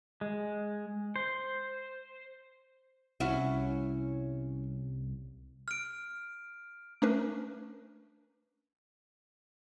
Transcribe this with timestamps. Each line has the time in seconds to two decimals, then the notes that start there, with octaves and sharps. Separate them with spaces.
0.21 G#3
1.16 C5
3.20 C2 C#4 E4 F#4
5.68 F6 D7
7.02 A3 C#4 D4 A#4 B4